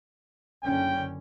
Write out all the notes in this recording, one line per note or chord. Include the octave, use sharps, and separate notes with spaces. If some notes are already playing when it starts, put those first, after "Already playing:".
F#1 D3 C#4 G5